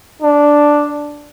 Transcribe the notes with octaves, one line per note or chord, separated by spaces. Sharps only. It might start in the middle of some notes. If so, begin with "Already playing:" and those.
D4